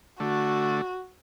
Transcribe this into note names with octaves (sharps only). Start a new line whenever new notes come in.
D3 A3 F#4